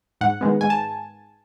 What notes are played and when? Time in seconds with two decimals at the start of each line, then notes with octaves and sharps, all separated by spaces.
0.21 G#2 F#5
0.41 D#3 G#3 B3
0.61 G#2 G#5
0.70 A5